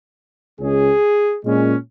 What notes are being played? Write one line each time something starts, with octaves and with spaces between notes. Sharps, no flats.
C#2 C#3 G#3 C#4 G#4
A#2 G#3 C#4